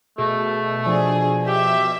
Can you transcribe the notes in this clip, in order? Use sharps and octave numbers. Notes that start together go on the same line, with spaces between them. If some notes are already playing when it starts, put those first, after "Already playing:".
B2 A3 G#4
F3 D4 G#4
G4 E5